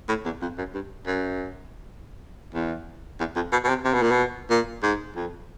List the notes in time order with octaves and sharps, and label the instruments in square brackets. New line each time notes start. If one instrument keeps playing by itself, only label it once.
[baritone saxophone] A2
E2
F2
F#2
G2
F#2
E2
E2
F2
B2
B2
C3
C3
B2
A#2
B2
A#2
G#2
F2